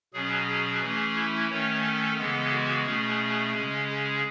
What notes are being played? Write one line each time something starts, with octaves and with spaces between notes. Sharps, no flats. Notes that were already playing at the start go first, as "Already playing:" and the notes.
B2 F#3 C#4 G#4
G#4
E3 A3 C#4
E4
D#3 A3 C#4 C#5
A4
C#3 E3 G#3 B3 A4
F#4
B2 A3 C#4 G#4
C#3 G#3 C#4
G#4